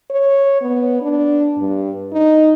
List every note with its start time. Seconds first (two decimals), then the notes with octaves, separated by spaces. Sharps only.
0.10 C#5
0.61 B3
1.02 D4
1.58 G2
2.12 D#4